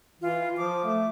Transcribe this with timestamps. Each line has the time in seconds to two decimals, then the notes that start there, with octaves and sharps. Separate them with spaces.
0.22 E3 F4
0.57 F3 D6
0.84 A3